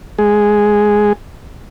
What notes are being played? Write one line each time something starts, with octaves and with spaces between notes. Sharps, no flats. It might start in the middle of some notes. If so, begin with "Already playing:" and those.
G#3 G#4